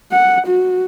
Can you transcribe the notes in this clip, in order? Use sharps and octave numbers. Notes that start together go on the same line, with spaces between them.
F#5
F#4